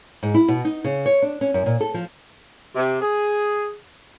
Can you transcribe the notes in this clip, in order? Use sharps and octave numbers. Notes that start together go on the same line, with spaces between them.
G#2
E4
B2
D#4
C#3
C#5
D4
C#4
F#2
A#2
A4
F3
C3
G#4